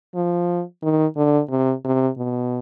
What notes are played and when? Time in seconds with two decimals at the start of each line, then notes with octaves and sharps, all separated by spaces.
0.15 F3
0.83 D#3
1.17 D3
1.50 C3
1.84 C3
2.17 B2